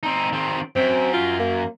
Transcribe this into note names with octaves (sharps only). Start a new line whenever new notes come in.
C4 D#4
D#3 C4
F#2 C4
F4
A#3